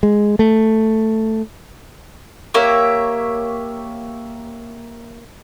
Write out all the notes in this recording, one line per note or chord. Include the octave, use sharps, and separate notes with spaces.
G#3
A3
A#3 G4 C#5 E5